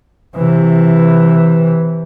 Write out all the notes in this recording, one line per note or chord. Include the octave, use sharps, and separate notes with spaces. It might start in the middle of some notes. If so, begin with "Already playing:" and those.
C3 E3